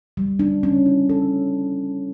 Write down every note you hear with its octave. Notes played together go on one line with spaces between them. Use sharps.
G3
D4
C#4
E4
A4